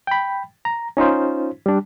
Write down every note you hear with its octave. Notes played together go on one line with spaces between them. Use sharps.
G5 B5
A#5
C#4 D#4 F4 C5
G3 D4